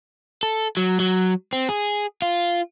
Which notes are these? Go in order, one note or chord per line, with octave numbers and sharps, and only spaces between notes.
A4
F#3
F#3
C4
G#4
F4